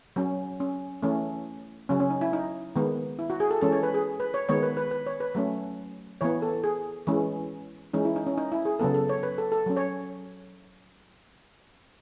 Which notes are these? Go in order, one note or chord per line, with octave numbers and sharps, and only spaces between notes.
F#3 C#4
C#4
E3 A3 C#4
C#3 F#3 C#4
C#4
D#4
E4
D#4
D#3 G#3 B3
E4
F#4
G#4
A4
E3 G#3 C#4 A4
C#5
B4
G#4
B4
C#5
D#3 G#3 B3 C#5
B4
B4
B4
C#5
B4
F#3 A3 C#4
E3 B3 C#5
A4
G#4
E3 G#3 C#4
E3 G#3 C#4 D#4
E4
D#4
C#4
D#4
E4
G#4
C#3 F#3 B3 A4
A4
C#5
B4
A4
A4
F#3 C#4
C#5